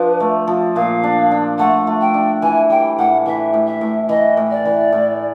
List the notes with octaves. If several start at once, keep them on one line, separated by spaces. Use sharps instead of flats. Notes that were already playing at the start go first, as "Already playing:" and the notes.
Already playing: F3 D4 B4
A3
F3
A#2 F5
D4
D4
A3 F#5
A3
G5
D4
E3 G#5
G3 G5
A2 F#5
E3 E5
A2
E5
A2
E3 D#5
A2
D5
E3
A2